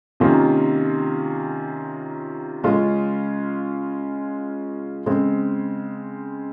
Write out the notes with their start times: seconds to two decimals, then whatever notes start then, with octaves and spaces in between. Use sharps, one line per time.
0.20 C3 D#3 A#3 C#4 F4
2.64 C#3 G#3 C#4 F4
5.06 C#3 G#3 C4